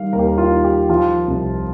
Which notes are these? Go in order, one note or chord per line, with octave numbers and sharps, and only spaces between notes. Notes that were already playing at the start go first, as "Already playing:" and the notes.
Already playing: D#3 G3 F5
D#2 A#4
G4
A#4
F4
D#3
G4
F3 F4
C2